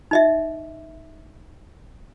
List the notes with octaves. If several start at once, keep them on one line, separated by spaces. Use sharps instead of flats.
D#4 D#5 E5